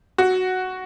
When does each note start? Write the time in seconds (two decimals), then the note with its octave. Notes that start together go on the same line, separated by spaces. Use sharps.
0.18 F#4